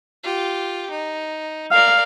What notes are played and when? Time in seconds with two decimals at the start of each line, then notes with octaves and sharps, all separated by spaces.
0.24 F4 G4
0.90 D#4
1.71 A#4 D5 F5